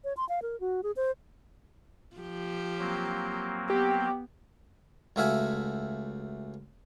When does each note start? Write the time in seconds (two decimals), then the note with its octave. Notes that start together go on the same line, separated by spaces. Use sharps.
0.04 C#5
0.17 C6
0.29 F5
0.42 A#4
0.60 F#4
0.83 G#4
0.96 C5
2.17 F3 G4
2.79 F#3 A#3 C4
3.70 B3 G4
5.16 C#2 A3 F#4 E5 F5 G#5